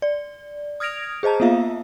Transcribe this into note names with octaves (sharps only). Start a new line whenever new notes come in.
D5
D#6 F6 G#6 A#6 D7 F7
G#4 C5 D#5 A5 A#5
A#3 B3 F4 E5 F5